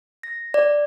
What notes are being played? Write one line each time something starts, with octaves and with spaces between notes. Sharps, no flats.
A#6
D5